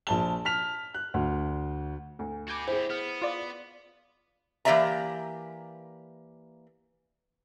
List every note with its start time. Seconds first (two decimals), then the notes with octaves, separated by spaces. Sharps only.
0.07 A#1 A5 G7
0.45 A5 F6 B6 F7
0.94 F#6
1.14 D2
2.19 D2
2.48 F#4 B4 D6 G6 G#6
2.68 D3 E4 G4 G#4 C5
2.90 B3 F6
3.22 F4 D5
4.65 E3 A#3 G4 D5 E5 A#5